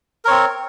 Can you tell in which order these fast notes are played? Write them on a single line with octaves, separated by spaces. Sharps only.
A#4 C#5 C4